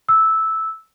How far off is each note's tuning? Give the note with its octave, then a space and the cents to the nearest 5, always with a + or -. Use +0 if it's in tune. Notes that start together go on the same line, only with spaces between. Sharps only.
E6 -10